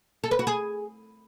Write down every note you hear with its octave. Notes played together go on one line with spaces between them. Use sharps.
A4
B4
F#4
G#4